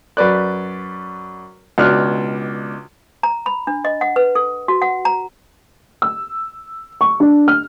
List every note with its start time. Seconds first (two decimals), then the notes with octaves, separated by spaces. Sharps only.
0.17 F#2 B4 D5 F#6
1.78 C#2 B2 D4 F6 F#6
3.23 A#5
3.46 B5
3.67 D4
3.85 D#5
4.01 F#5
4.16 B4
4.35 A4
4.68 F#4
4.82 F#5
5.05 A#5
6.02 E6
7.01 C#6
7.20 D4
7.48 F6